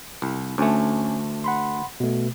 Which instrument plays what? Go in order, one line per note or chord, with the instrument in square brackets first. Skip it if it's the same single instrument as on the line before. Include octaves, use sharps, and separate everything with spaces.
[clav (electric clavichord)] C2
[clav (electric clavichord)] D2 A3 [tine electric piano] C#4 G#5
[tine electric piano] F#5 B5 C6
B2 A3